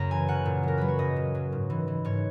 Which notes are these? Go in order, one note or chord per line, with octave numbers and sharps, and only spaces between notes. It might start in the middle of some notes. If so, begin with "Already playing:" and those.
Already playing: F#2 C#3 A#5
E3 G#5
C#3 F#5
A#2
F#3 A#4
F#3 B4
C#5
A#2 D#5
A#2
F#3
G#2
E3
E3
G#2 C#5